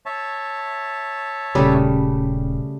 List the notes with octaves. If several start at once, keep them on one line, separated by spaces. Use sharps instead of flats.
C#5 E5 A5
D#1 C#3 G3 A3